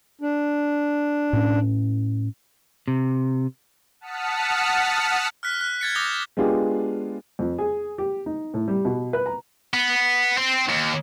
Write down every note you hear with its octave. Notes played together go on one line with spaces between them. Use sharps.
D4
A2 C#4
C3
F#5 A5 D#6 F6 B6 C#7
F6 F#6 B6
F#6
G#6 A6 C#7
D6 D#6 G6 A#6 G7
G#3 B3 D4 F4 G4 G#4
F2
G#4
G4
D#4
A2
G3
B2
B4
A#5
B3
C4
D#2